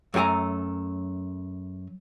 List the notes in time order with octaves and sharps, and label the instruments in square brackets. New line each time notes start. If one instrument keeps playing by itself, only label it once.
[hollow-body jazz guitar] F#2 A3 G4 G#5 A#5